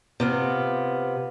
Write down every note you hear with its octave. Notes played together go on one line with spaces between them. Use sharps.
C3 B3 F4